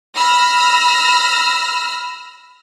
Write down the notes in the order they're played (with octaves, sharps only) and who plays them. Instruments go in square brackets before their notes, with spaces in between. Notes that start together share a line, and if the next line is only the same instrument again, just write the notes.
[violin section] B5 E6 F6 A#6